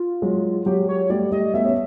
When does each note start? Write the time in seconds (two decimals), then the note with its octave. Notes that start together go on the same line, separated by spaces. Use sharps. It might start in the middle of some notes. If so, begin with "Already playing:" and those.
Already playing: F4
0.22 F#3 G#3
0.66 F#3 G#3 G4
0.89 C#5
1.10 G3 A3 D5
1.32 G3 A3 D#5
1.54 A3 B3 E5
1.64 B3 C#4